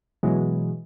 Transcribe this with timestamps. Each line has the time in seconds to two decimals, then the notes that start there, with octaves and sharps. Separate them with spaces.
0.23 B2 E3 F#3 G#3